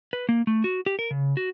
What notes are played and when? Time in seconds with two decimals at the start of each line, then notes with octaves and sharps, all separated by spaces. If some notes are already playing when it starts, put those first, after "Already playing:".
0.13 B4
0.29 A#3
0.47 A3
0.64 F#4
0.86 G4
0.99 A#4
1.11 C#3
1.37 F#4